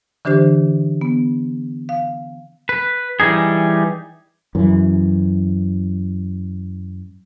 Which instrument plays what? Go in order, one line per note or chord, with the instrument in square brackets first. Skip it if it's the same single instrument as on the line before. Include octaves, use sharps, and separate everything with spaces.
[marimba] D3 E3 D4 G4 C5
B3
F5
[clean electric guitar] B4
E3 G3 D#4 G#4
[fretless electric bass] F#2 E3